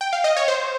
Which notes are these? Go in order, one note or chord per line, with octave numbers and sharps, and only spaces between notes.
G5
F5
D#5
C#5
C5